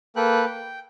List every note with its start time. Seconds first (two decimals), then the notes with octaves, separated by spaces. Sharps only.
0.16 A#3 A4 B4 G5 F#6
0.45 G5